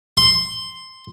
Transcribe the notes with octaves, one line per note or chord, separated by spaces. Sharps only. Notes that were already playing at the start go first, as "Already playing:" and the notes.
C6